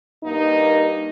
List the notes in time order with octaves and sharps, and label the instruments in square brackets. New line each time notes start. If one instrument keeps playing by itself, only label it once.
[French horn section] G2 A#3 D#4